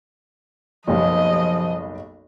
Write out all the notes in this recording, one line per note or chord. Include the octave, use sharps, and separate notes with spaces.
F#1 B1 F3 G3 D#5